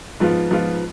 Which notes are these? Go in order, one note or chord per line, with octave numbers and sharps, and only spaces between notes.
G#2 F3 B3 F4
G#2 F3 B3 F4